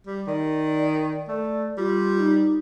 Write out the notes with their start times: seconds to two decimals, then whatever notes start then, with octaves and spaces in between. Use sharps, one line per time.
0.07 G3
0.27 D#3 D5
1.28 A3 D5
1.78 G3 F4
2.18 D#4